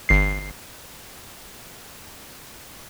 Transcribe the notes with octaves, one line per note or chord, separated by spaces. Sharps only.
G1 C7